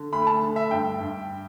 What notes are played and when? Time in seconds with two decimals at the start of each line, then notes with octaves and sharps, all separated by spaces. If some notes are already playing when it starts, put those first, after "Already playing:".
Already playing: D3
0.13 D2 B5
0.27 A5
0.42 D3
0.56 E5
0.71 G2 G5
1.00 G2